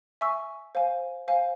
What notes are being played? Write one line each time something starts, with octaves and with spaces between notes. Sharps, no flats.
E5 G#5 C#6 E6
C5 F5 G#5
C5 F5 G#5